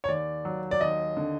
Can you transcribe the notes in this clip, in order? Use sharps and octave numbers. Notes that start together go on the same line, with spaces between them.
C#5
D#2 D5
F#3
D5
D#2 D#5
D3